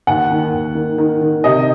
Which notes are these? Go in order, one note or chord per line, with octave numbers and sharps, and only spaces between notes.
D#2 F#5
D#3
D#2
D#3
D#3
D#3
C3 D#5